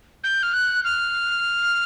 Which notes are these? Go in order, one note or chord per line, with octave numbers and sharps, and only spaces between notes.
G6
F6
F#6
F6